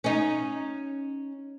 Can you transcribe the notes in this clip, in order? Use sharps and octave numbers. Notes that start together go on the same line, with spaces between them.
C#4 D#4